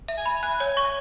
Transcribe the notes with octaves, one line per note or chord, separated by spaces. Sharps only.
E5
G#5
B5
G#5 F#6
C#5
G#5
C#6